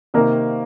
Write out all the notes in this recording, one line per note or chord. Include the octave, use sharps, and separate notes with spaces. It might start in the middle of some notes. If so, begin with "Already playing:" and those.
C3 D#3 A#3 A#4